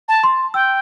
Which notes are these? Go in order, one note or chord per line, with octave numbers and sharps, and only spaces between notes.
A5
C6
G5 E6